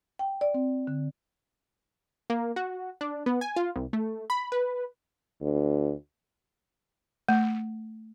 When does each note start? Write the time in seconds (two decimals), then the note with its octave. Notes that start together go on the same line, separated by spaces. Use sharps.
0.19 G5
0.41 D5
0.54 C4
0.87 D3
2.30 A#3
2.56 F#4
3.01 D4
3.26 B3
3.41 G#5
3.56 F4
3.76 C2
3.93 A3
4.30 B5
4.52 B4
5.41 D2
7.29 A3